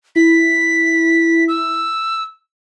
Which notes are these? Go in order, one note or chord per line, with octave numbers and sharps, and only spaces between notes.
E4 B6
E6